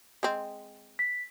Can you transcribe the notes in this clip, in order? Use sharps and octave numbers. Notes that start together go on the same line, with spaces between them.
G#3 C4
B6